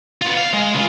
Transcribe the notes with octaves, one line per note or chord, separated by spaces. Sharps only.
B3 F4
F5
G#3
C#2 F4